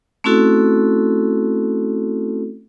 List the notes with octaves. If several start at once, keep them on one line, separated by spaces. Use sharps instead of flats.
A3 C4 C#4 E4 F#4 A4